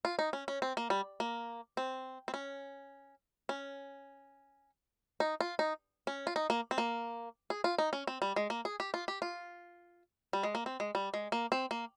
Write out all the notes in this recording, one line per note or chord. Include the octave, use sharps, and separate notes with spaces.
F4
D#4
C#4
C#4
C4
A#3
G3
A#3
C4
C4
C#4
C#4
D#4
F4
D#4
C#4
F4
D#4
A#3
C4
A#3
G#4
F4
D#4
C#4
C4
G3
G#3
A#3
G#4
G4
F4
G4
F4
G3
G#3
A#3
C4
G#3
G3
G#3
A#3
C4
A#3